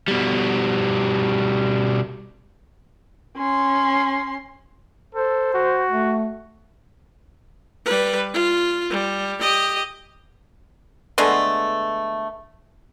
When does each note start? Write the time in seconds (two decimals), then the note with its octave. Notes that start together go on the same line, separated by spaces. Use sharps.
0.08 B2 G3
3.37 C#4 C6
5.15 A4 C5
5.55 F#4
5.89 A3
7.85 G3 B4
8.33 F4
8.90 G3
9.41 G4 D#5
11.18 D3 G#3 A3 B3